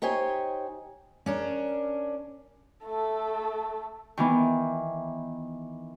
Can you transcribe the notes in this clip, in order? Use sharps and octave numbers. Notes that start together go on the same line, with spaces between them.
D#4 G4 C5 C#5 G#5
C#4 D4 A#4
A3 A4
D#3 E3 B3